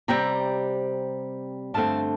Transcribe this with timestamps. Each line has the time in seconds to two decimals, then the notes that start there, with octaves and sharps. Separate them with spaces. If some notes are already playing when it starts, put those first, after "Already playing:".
0.08 C3 G3 C4 G5 A#5
1.74 G2 D3 A3 C4 F5 A5